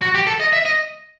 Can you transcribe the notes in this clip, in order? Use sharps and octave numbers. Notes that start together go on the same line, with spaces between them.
F#4
G4
A4
D#5
E5
D#5